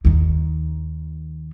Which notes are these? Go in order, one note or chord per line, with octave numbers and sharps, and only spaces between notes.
D#2 D#3